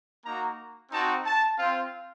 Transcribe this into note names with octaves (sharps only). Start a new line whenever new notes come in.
A#3 D#4 F#4 A#5
C4 D#4 F#4 A5
A5
C4 F4